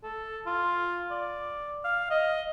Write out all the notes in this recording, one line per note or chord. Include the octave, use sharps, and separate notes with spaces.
A4
F4
D5
F5
D#5